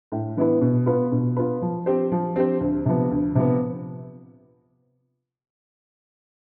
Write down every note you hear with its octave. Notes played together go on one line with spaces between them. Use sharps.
A2
E3 B3 E4 B4
B2
B3 F4 B4
B2
B3 F4 B4
F3
C4 G4 C5
F3
C4 G4 C5
D2
C3 F3 B3
D2
C3 F3 B3